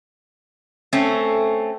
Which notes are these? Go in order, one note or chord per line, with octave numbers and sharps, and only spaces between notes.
A3 C4 C#4